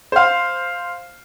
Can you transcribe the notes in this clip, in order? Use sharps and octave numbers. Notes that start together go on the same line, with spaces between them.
C5 F5